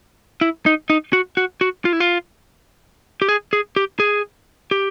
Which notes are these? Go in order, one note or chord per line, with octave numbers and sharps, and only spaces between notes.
E4
D#4
D#4
F#4
F#4
F#4
F4
E4
F4
G4
G#4
G#4
G4
G#4
G4